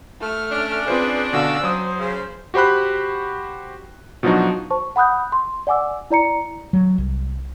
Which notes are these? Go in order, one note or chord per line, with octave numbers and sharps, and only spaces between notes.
A3 F6
C#4 D4
C4 F4 G#4 B4 C5
B2 D3 F#4 F5 E6
F#3 C5 D#6
C#3
F#4 G4 C5 B5 F#6
B2 F3 F#3 D4 D#4 F#4
C5 A5 C#6
F#5 B5 D#6 F#6 G6
C6
D5 F#5 G#5 D6 E6
E4 D5 A#5 C#7
F#3
C2